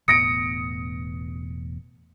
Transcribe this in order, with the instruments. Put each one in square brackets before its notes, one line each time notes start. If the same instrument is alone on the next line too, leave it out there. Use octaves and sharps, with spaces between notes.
[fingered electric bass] E1 A2 B3 [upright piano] D#6 A#6 D7 [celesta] C#7